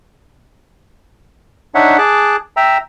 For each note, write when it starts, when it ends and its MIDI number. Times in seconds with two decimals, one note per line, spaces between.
1.75 1.97 62
1.75 1.97 63
1.75 1.97 73
1.75 1.97 76
1.75 1.97 78
1.98 2.36 68
1.98 2.36 81
1.98 2.36 86
1.98 2.36 90
2.57 2.78 76
2.57 2.78 79
2.57 2.78 82
2.57 2.78 88